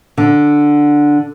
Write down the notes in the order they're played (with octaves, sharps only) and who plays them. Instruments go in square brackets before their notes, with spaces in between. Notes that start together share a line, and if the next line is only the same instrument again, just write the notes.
[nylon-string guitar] D3